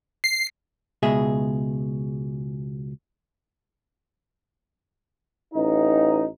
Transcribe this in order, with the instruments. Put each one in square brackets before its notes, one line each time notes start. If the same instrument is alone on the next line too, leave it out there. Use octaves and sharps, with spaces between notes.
[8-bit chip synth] C7
[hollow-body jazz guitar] C#2 B2 G#3 G#4 E5
[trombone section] A1 D#4